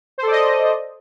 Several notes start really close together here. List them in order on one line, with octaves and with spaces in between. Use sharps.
C5 A4 D5 D#5